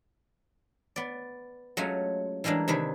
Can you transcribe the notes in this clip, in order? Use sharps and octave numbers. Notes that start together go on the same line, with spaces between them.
B3 D5
F#3 G#3 A3 C#4 F4
E3 G3 G#3 A#3 D4
C3 D#3 D4 B4 G#5